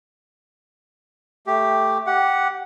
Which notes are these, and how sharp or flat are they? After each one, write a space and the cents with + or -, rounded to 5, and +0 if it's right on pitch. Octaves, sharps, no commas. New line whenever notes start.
A3 +0 G4 +0
G4 -15 F#5 +0